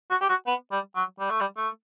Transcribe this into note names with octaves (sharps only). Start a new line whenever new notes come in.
F#4
G4
F#4
B3
G3
F#3
G3
A3
G3
A3